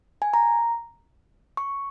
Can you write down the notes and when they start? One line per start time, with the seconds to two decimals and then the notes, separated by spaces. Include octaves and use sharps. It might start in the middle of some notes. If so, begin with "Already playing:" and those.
0.22 G#5
0.34 A#5
1.57 C#6